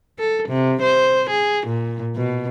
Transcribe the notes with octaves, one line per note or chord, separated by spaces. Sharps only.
A4
C3
C5
G#4
A#2
B2